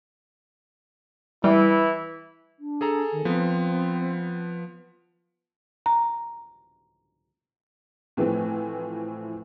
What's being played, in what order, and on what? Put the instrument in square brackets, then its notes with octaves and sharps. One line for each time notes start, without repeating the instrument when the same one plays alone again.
[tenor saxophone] E3 [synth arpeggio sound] G3 [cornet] E4
[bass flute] D4
[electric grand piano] G#4 A4 A#5
[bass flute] D#3
[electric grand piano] F3 B3 [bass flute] C4
[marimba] A#5
[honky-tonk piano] A2 E3 F3 A3 C4